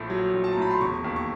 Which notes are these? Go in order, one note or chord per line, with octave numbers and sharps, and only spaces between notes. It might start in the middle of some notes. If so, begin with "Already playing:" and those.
Already playing: A#1 A2 A3
F#3
A#1
A5
A#5
A2 B5
C6
E1 C#6
D#2
C#6